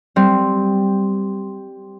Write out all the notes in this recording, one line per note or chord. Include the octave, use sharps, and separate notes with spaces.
G3 C4